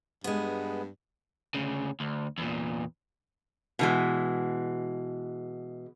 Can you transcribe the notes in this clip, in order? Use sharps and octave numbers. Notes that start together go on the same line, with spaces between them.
G2 G#3 B3
D2 C#3
D2
E2 A#2
B2 E3 G#3